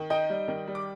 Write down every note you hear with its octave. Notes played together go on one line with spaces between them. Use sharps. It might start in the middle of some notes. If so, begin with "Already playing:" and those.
Already playing: D#3
D#4 D#5 G5
G3
D#3
G3
D6